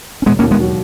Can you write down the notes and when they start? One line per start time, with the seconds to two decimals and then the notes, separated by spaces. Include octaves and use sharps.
0.22 C#4
0.26 E1 G#3 B3
0.39 A#3 C#4
0.43 D#2
0.51 G#3 B3
0.60 F#3